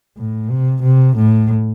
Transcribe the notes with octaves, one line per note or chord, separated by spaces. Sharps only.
A2
C3
C3
A2